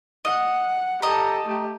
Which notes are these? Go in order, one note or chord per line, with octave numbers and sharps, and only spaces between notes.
D#5 F#5
G4 A4 D#5 A#5
A3 G4